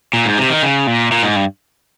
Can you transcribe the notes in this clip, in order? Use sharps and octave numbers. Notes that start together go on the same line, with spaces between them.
A#2
G#2
C3
D#3
C#3
A#2
A#2
G#2
G2